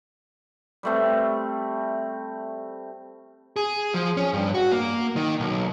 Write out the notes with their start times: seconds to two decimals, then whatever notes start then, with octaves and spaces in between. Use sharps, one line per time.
0.83 G3 A3 C4
3.56 G#4
3.94 F3
4.17 C#4
4.33 G2
4.54 F#4
4.72 A#3
5.16 D#3
5.40 B1